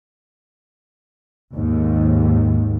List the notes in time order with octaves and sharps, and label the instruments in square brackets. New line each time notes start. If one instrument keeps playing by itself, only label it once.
[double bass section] D#2 G#2